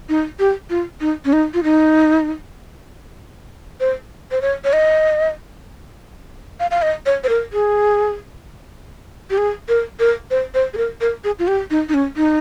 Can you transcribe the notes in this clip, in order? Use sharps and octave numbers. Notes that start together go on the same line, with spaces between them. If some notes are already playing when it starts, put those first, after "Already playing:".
D#4
G4
F4
D#4
C#4
D#4
F4
D#4
C5
C5
C#5
C#5
D#5
F5
F5
D#5
C#5
C5
A#4
G#4
G4
G#4
A#4
A#4
C5
C5
G#4
A#4
A#4
G#4
F4
G4
D#4
D#4
C#4
D#4